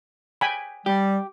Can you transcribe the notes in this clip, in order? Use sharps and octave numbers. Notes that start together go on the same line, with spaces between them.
G5 G#5 B5
G3 G4